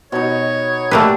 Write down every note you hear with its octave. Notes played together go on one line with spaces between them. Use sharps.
B2 D#4 C#5
A3 A#3 D4 G4 B4